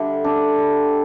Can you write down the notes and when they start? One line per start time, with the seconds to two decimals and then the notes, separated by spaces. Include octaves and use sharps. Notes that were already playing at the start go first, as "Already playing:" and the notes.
Already playing: D3 G3 E5
0.24 D4
0.58 G3